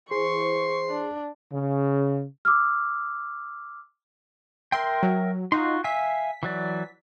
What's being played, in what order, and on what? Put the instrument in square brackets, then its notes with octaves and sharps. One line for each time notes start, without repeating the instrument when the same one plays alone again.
[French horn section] E3 C5 [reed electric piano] G#4 [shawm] C6 [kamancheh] C#6
[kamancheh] D4
[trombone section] C#3
[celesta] D6 E6 F6
[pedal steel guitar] A#4 E5 G5 [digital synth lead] C6
[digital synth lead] F#3
[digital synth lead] D#4 [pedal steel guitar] F4 F#4 C6
[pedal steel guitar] E5 F5 G#5 [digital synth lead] B6
[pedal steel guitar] E3 F#3 D5